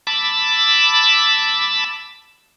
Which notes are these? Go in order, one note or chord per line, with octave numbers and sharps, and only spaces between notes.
A5 B5 D6 E6